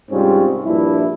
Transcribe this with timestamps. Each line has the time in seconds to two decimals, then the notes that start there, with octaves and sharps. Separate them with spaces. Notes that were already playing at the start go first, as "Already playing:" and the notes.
0.11 C2 G#2 G3 C4 C#4 F4
0.64 A#1 G2 D4 E4